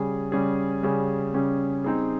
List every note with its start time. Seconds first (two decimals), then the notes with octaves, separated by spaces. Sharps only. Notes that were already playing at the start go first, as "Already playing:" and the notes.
Already playing: C#3 G3 C#4 G#4
0.32 C#3 G3 C#4 G#4
0.83 C#3 G3 C#4 G#4
1.34 C#3 G3 C#4 G#4
1.84 G3 C4 D#4 G#4